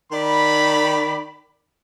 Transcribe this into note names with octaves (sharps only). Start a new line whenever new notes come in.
D#3 D5 B5